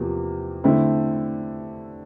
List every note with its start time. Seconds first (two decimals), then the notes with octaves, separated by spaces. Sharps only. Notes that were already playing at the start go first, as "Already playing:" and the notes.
Already playing: E2 C3 F3 A#3
0.64 D3 A3 C4 E4